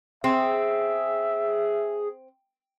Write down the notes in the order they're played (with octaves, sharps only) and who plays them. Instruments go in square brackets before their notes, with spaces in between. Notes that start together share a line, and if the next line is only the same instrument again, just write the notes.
[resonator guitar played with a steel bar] C4 [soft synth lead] G#4 [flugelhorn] E5